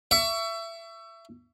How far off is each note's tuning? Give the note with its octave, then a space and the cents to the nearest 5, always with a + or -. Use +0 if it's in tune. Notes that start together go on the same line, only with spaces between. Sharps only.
E5 +25 C#6 +25